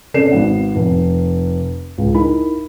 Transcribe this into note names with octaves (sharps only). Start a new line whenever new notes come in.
C3 C#4 A4 D5 C7 E7
G#1 B3 F#5
F1
C#2
D#4 E4 A#4 B5